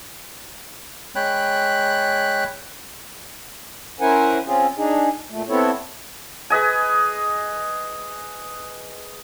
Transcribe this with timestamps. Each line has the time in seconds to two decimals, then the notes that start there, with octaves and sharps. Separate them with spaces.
1.16 G#3 C#5 G5 B5 F#6
4.01 C#4 E4 A#4 C5 F#5 G#5
4.46 C4 C#4 F4 G#4
4.77 D4 D#4 G#4
5.30 A#2 A3
5.49 B3 C4 E4 A4 C#5
6.50 G#4 B4 D#5 G#5